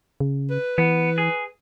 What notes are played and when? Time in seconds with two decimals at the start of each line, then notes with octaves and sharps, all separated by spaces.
0.20 C#3
0.51 B4
0.78 E3 B3
1.18 G#4